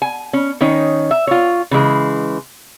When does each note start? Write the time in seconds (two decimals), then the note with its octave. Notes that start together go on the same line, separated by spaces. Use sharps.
0.02 G#5
0.33 C#4
0.61 D#3 C#4 D#4 C#5
1.11 E5
1.27 F4 C#5
1.71 C#3 E3 G#3